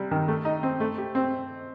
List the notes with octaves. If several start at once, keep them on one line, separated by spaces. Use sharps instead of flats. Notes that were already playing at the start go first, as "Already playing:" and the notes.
Already playing: C3 G3
D#3
A3
D#4
C4
A3
G4
C4